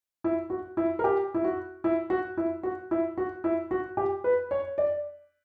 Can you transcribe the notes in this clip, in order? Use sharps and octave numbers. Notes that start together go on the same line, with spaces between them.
E4
F#4
E4
A#4
G4
E4
F#4
E4
F#4
E4
F#4
E4
F#4
E4
F#4
G4
B4
C#5
D5